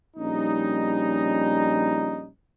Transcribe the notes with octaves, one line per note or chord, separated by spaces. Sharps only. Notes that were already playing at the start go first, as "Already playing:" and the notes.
A#1 G3 C#4 D#4